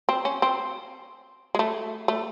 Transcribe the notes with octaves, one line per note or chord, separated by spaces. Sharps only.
C4
C#4
C4
G#3
A3
A3